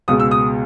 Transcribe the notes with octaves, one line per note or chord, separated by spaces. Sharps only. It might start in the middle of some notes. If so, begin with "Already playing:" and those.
C#2 B2 G#3 D#6
E6
D#6